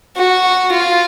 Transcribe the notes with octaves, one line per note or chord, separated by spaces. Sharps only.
F#4
F4